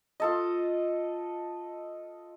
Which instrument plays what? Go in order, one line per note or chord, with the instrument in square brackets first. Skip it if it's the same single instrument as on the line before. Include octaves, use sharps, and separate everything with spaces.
[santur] F4 A4 D#5